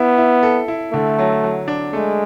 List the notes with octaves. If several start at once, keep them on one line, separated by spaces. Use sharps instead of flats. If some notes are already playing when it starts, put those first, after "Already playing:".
Already playing: B3 E4
E4
A4
E4
D3 A3
F#3
F#3
D4
G#3 A3